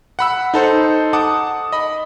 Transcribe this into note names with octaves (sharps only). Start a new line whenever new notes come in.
F#5 B5 E6
D#4 A4 C5
F#5 A5 D6 D#6
D#5 B5